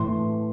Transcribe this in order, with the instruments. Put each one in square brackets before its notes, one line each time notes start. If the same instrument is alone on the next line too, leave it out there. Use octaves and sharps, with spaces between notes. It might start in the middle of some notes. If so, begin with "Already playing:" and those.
Already playing: [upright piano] A2 E3 C6